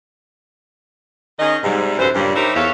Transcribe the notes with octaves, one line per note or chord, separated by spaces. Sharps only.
D#3 C#4 G#4 D#5
G#2 C3 G3
F#2 E3 A4 C5
G2 A#2 C#3 G3
D#4 E4 G4 A#4 C5 C#5
E2 A4 C#5 E5 F5